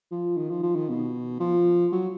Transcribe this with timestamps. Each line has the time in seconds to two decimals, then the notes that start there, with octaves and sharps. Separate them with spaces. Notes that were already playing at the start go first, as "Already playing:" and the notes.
0.11 F3
0.37 D#3
0.50 F3
0.63 F3
0.76 D#3
0.89 B2
1.40 F3
1.92 F#3